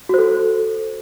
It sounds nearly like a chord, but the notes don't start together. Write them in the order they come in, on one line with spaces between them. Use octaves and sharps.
F#4 C5 A4